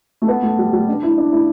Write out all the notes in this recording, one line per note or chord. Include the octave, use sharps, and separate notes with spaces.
A3
B3
A3
G3
G3
D4
E4
D4
E4